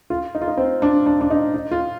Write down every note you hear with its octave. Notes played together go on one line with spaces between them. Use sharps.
F4
D#4
F4
D#4
C4
D4
D4
D4
D#4
D#4
F4